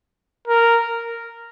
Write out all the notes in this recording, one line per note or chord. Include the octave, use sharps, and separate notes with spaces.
A#4